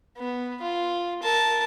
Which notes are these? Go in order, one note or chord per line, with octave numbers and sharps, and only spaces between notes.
B3
F4
A#4 A5